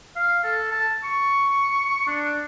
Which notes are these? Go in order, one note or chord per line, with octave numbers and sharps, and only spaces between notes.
F5
A4
A5
C#6
D4